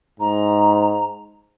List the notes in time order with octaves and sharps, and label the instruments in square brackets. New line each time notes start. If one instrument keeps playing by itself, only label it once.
[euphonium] G#2 [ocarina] A#5